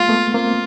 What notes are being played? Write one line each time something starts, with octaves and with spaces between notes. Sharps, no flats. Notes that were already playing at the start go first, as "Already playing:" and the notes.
Already playing: G#3 A#3 F4
A3 B3
A#3 C4 F4